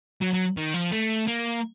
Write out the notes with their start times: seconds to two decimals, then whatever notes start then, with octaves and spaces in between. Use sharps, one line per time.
0.21 F#3
0.33 F#3
0.57 D#3
0.74 F3
0.92 A3
1.27 A#3